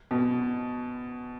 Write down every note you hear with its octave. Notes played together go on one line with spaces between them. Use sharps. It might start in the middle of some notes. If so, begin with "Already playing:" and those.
B2